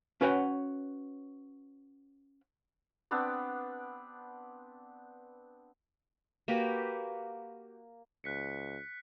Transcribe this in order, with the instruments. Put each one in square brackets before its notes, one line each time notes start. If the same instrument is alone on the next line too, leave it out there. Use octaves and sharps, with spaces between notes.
[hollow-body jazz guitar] C#4 F#4 B4 C#5 F#5 G5
[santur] B3 C4 D4 D5
[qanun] A#3 F#4 G4 B4
[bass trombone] C#2 [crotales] F#6 B6 C#7